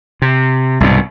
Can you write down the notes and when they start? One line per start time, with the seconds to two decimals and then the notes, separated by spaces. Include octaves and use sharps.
0.22 C3
0.80 C2 G#2 B2